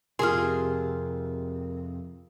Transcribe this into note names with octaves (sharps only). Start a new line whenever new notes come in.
F2 C3 F4 G#4 A#4 C6 D#6 F6